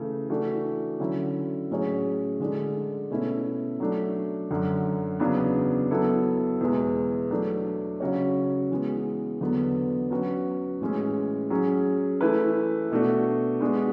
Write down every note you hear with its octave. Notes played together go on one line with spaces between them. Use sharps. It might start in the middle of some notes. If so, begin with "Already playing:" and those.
Already playing: C#3 E3 A3
E3 A3 D4 F#4
D3 F#3 C#4 E4
A2 F#3 C#4 G#4 C#5
D3 G#3 D4
B2 A3 C#4 E4
F#3 A3 D4
F#2 D3 F#3
E2 C#3 F#3 B3 D4
F#3 B3 E4 A4
E2 B2 G#3
F#3 A3 D4
C#3 F#3 C#4 F#4 C#5
E3 G#3 B3
E2 D3 F#3 B3
F#3 C#4 F#4 B4
A2 E3 G#3 C#4
F#3 C#4 G#4
E3 A3 E4 B4
B2 A3 D4 F#4
G#3 B3 D4 F#4